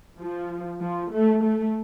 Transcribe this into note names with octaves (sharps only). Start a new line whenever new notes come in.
F3
F3
A3
A3